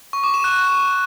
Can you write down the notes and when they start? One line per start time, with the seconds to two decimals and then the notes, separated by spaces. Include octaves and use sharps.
0.13 C#6
0.24 D6
0.34 E7
0.44 F#6